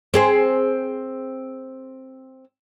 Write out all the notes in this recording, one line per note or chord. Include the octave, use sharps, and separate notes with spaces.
C4 G#4 C5